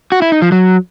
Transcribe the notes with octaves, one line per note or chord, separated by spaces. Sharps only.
F#4
E4
D#4
F3
F#3